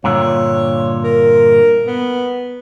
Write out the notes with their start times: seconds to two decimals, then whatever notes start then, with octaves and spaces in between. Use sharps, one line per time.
0.04 G2 A#2 D3 C#5
1.04 A#4
1.87 B3